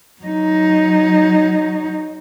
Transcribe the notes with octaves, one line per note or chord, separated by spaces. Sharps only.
F#3 D#4